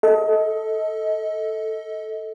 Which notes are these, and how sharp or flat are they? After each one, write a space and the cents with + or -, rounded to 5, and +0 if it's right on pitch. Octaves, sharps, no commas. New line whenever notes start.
A4 +0 D#5 +30